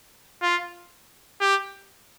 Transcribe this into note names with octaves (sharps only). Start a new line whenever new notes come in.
F4
G4